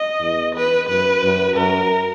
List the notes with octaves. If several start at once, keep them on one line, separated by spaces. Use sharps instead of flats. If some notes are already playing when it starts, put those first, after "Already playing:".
Already playing: D#5
E2
B4
F#2 B4
F#2
F#2 A#4